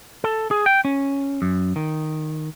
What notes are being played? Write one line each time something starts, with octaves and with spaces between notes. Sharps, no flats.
A4
G#4
G5
C#4
F#2
D#3